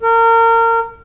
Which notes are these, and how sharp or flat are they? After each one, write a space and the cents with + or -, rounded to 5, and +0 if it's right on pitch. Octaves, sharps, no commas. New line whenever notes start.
A#4 -30